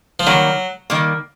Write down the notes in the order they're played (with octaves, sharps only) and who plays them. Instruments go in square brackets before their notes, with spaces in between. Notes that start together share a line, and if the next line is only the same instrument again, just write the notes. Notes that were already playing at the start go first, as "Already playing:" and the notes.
[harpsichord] F3
[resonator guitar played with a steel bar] D#3 G3 A#3 [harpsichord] F#3
[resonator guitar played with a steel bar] D#3 G3 A#3